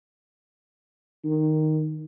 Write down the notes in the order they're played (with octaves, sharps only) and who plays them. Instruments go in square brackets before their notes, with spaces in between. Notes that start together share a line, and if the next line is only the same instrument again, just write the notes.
[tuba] D#3